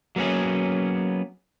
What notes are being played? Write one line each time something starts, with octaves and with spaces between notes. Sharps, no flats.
F#3 A#3 B3 C#4 G#4